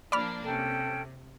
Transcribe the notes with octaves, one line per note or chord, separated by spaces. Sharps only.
F3 A#3 D4 D5 B5 F6
C3 C#4 A4 G5